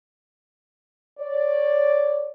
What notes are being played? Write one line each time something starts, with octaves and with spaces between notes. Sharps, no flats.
C#5 D5